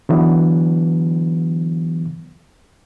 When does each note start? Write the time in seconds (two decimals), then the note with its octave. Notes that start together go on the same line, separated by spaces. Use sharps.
0.09 D3 E3 F#3 B3